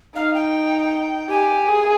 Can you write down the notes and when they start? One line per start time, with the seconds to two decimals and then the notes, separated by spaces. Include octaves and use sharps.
0.15 D#4 F5
0.34 G5
1.29 G4 G#5
1.68 G#4